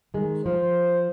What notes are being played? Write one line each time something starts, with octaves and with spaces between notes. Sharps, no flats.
D#3 G#3
F3 C5